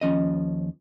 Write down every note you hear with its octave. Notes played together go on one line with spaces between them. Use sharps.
D#2 F3 C#4 D#5